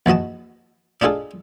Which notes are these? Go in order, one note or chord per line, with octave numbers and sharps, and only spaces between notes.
A#1 E3 F#4 D#5 A5
D4 D#4 F4 G#4 A4